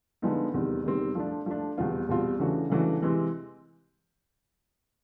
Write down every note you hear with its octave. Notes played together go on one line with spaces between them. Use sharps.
D3 F3 G#3 B3 D#4
E2 C3 D#3 G3 C4
E2 C3 D#3 G3 C4
F3 A3 D4
F3 A3 D4
E2 B2 G3 C4 F4
E2 B2 G3 C4 F4
C#3 E3 A3 D4 F#4
C#3 E3 A3 D4 F#4
C3 E3 G#3 C4